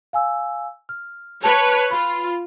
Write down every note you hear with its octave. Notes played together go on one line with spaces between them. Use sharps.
F5 G#5 E6
F6
B4 C#5 A5
F4 B5